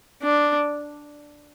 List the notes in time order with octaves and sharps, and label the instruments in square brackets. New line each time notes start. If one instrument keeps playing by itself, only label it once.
[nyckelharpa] D4